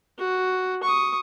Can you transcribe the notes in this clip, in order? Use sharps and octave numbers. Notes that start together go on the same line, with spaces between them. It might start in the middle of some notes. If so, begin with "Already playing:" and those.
F#4
C#6 D#6